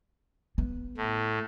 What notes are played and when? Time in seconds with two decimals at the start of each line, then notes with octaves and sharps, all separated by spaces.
0.58 B3
0.97 A2